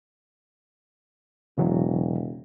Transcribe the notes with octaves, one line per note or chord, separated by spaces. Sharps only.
E1 C#3 E3 F#3